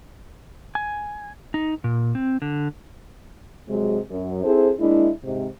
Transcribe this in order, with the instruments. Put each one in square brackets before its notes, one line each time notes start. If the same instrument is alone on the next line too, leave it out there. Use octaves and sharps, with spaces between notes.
[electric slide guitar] G#5
D#4
A#2
C4
D3
[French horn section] C3 F#3 G#3
F#2
C4 E4 G#4 A4 C5
G#3 A#3 D4 E4
G#2 C3